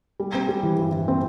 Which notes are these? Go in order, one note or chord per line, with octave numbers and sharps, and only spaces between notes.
G3
C4
G3
E3
G2
E3
C4